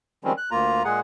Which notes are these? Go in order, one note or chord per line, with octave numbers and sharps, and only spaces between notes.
D#3 F3 G3 G#3 C4 C#4
F#6
D2 A#3 F4 A#5
A#2 G#3 G#4 F#5